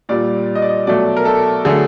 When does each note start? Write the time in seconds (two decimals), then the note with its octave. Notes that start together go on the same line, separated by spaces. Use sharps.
0.09 A#2 G3 D5
0.55 D#5
0.62 D5
0.69 D#5
0.87 B2 F#3 A3 D5
1.17 A#4
1.25 A4
1.65 D3 F#3 A3 G#4